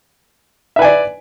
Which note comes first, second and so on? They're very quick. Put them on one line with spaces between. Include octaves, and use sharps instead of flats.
E5 B4 G#5 D5